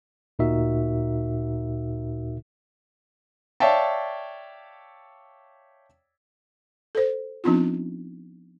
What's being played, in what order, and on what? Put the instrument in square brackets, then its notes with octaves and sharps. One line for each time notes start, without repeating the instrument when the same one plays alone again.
[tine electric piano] D2 A#2 D#4 F#4 A#4 E5
[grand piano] C#5 D5 E5 F5 G5 A5
[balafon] A4 C5
F3 B3 C4 D4 D#4 F4